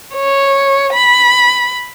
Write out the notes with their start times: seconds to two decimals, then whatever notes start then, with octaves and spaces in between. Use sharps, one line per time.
0.14 C#5
0.93 B5